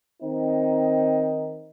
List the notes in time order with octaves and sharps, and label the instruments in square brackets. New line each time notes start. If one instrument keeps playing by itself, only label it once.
[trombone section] D#3 C4 D#4